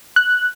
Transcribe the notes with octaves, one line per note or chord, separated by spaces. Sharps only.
F#6